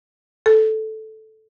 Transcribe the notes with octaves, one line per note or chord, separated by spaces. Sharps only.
A4